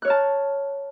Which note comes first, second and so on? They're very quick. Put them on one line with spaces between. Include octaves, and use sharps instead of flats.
F#6 C#5 F6 A5